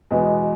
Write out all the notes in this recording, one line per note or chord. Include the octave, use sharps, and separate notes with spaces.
E2 B2 G#3 B3